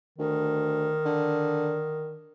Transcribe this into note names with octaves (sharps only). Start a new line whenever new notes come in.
D2 D#3
D3